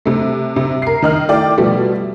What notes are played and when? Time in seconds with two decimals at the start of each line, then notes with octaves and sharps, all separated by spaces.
0.05 C3 A3
0.56 C3
0.82 A#4 C7
1.02 D#3 D#4 F6
1.29 A3 E4 D5 G5
1.58 B2 F3 G3 A3